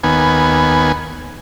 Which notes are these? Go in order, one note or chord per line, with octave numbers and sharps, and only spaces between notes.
D#2 B3 G#5